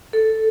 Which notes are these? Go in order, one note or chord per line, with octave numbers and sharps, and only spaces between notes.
A4